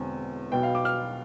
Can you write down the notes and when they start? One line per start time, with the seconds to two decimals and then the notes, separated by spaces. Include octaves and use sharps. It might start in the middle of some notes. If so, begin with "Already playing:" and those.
Already playing: E1 E2 D3 C4
0.51 B1 B2 B3 G5
0.63 F5
0.75 D6
0.85 F6